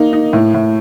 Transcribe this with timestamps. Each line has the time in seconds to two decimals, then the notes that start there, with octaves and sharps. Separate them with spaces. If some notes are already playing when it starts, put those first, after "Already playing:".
Already playing: A#3 D#4
0.13 D#4
0.33 A2
0.54 A2